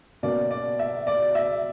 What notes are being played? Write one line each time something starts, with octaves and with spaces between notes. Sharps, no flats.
B2 F#3 A#3 C#4 D5
D5
E5
D5
E5